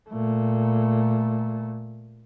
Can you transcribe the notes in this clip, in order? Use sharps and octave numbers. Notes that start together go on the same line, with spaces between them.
A#2 A3